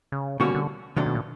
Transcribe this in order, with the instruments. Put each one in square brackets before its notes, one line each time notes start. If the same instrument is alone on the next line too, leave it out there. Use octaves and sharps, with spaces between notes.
[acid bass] C#3
[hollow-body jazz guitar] B2 G3 A#3 C#4 F#4 [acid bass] D3
[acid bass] D3
[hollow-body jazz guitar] D#2 D#3 F#3 A3 D4 [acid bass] C3
[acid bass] B2
A#2